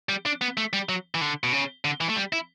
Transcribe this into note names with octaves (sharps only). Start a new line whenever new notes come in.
G3
D4
B3
A3
G3
F#3
E3
D3
B2
C#3
D3
E3
A3
G3
E4